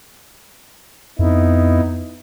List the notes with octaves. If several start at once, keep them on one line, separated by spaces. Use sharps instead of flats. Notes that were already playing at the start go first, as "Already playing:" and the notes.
F2 B3 D#4 E4